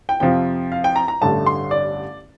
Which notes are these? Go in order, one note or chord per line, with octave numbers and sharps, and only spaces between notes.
G5
F2 C3 F3 G5
F5
G5
A#5
A#5
A1 G2 D3 A3 A5
C6
D5